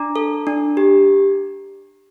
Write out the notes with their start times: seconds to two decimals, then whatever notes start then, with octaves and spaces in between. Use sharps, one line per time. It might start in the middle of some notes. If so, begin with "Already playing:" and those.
Already playing: D4 A#5 D6
0.16 A4
0.47 D4
0.77 G4